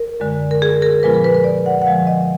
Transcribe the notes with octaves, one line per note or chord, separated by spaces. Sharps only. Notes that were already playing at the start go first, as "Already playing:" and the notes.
Already playing: A#4
F#2 D3 G#3
A#4
G#4
A#4
A#2 F3 G#3 B3 F4 B4
A#4
B4
B4
D5
F#5
F#5
D3 F3 G#3 F5
D#5